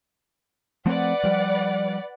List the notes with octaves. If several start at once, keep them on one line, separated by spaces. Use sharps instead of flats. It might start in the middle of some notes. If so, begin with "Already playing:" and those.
F3 A3 C4 B4 D5 F#5
F3 G3